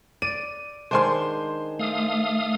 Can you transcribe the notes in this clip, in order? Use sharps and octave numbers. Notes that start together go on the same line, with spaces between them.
D5 D#7
D#3 G#3 D4 C5 G#5 C6
A3 F5 D#6